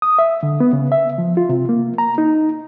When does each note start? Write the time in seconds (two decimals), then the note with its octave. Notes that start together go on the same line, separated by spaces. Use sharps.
0.02 D#6
0.19 E5
0.43 D3
0.60 B3
0.73 C#3
0.92 E5
1.18 F3
1.37 F4
1.49 C3
1.69 A#3
1.98 A#5
2.18 D#4